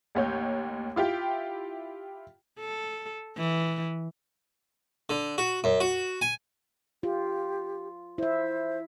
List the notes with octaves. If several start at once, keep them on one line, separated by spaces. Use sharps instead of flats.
A1 D#2 C#5 G6
E4 F4 G4 G5
A4
E3
D3
F#4
F#2
F#4
G#5
F4 G4
E4 C5 E5